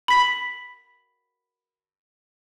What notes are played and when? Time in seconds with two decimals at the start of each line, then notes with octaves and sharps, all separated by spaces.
0.08 B5 B6